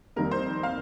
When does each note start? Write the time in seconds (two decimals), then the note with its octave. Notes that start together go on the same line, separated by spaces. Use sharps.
0.16 F2 D#3 G3 A#3 A#4
0.31 C5
0.63 F5